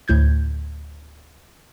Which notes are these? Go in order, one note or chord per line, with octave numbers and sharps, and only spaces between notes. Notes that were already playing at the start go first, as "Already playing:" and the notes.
D2 A2 G6 G#6